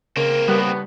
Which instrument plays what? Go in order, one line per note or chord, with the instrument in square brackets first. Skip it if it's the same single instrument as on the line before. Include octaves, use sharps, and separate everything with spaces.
[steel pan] C#3 [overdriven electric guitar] A#3 C4 [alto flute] A#4
[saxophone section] D#2 A2 B3 [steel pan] G3